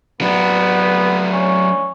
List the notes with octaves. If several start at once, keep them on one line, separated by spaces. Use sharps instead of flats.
F#3 B3 D4
C#4